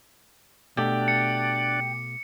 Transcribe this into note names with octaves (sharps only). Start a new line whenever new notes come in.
B2 A3 D4 G4 D5
C#7